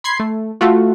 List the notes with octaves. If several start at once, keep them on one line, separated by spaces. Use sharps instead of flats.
B5 C6 G#6 C7
A3
A3 F4 F#4